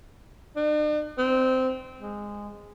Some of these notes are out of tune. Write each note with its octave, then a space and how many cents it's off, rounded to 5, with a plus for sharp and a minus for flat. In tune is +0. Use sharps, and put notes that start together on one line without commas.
D4 +45
C4 -15
G#3 -15